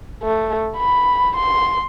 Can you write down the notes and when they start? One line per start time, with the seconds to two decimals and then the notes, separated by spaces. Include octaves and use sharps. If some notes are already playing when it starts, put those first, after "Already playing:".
0.23 A3
0.77 B5
1.36 C6